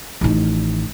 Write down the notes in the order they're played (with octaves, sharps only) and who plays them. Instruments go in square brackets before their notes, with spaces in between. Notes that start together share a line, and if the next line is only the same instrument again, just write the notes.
[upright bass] A1 D#3